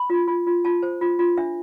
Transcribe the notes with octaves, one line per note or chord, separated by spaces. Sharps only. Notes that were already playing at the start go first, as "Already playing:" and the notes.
Already playing: B5
F4
F4
F4
F4 A5
C5
F4
F4
D4 E5